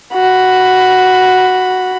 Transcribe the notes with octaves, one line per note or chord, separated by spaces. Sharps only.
F#4 B5